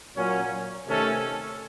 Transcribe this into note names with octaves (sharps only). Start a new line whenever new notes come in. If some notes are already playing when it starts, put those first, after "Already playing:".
A#2 F#3 A#3 C#4
C3 D#3 A3 C#4 A4